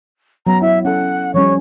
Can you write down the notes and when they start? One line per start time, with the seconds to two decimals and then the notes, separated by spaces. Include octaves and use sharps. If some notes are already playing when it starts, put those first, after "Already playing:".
0.47 F#3 B3 A#5
0.62 E4 E5
0.85 C#4 A4 F#5
1.34 F3 G3 C#4 C#5